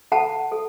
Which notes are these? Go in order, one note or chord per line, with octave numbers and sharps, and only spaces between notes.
A4 F#5 A5
A4